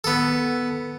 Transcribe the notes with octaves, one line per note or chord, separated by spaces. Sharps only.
B3 A4